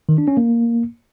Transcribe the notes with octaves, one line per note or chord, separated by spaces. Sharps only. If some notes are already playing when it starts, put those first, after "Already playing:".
D#3
D4
C#4
A#3